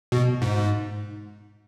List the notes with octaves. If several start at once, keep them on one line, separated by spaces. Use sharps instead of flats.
B2
G#2